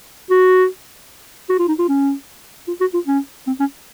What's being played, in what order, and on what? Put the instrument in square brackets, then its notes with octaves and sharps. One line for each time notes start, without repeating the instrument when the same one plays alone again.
[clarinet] F#4
F#4
F4
D#4
F4
C#4
F4
F#4
F4
C#4
C4
C#4